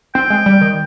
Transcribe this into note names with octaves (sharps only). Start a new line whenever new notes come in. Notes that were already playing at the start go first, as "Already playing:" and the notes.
C4 G5
G#3
G3
D#3